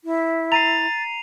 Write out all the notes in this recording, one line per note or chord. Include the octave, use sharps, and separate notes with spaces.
E4
A#5 A6 C7 D#7 F7